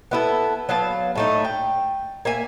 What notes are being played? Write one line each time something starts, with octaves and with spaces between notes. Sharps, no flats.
B3 E4 A4
F#3 B3 F5 A5
A2 A3 D#4
G5
A#3 E5 G#5